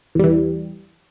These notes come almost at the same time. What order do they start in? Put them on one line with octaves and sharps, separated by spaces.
E2 G3 E3